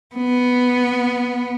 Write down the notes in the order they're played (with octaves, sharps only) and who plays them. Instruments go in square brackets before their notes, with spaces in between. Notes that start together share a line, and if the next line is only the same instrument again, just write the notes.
[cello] B3